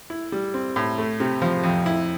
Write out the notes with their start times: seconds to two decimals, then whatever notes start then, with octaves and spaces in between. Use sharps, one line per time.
0.10 E4
0.32 G3
0.54 C4
0.76 A2
0.98 A3
1.20 C3
1.42 F3
1.64 F2
1.86 E4